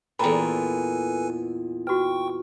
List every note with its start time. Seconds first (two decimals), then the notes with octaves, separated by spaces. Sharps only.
0.19 E2 A#2 A4 B4 G5 G#5 A#5 B5
1.87 F#4 B4 G5 C#6